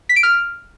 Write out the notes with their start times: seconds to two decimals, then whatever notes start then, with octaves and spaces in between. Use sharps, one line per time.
0.09 B6
0.16 D7
0.23 F6